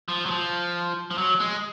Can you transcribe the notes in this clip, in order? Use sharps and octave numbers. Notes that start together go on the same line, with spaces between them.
F3
F#3
F3
F3
F#3
G#3